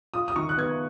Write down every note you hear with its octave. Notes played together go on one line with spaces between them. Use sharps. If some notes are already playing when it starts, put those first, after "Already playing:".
F4 D#6
D#6
D#3 C#6
F#6
B3 G#6